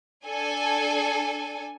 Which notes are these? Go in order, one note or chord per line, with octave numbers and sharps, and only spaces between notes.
D4 A4 G#5